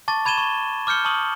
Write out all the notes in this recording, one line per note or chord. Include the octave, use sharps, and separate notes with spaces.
A5 C#6 D6 A6
B5 G#6 D#7 E7 G7
C#6
D6 F6 G6 C#7 G7
A5 C#6 D#6 F#7